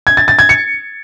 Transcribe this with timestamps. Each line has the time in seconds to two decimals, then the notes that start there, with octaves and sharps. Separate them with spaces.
0.07 G#6
0.17 A6
0.28 A6
0.39 G#6
0.49 C#7